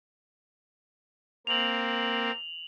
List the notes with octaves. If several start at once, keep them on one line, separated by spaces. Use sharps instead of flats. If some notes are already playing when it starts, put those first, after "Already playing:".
A#3 C4 F7 F#7